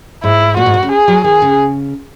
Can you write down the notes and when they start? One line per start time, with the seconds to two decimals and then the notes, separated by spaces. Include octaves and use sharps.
0.23 G#2 E4
0.57 A#2 F#4
0.66 G#2
0.74 A#2
0.83 C#3
0.92 G#4
1.08 F#3
1.24 D#3 G#4
1.42 C#3